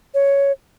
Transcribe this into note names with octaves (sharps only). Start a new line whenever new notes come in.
C#5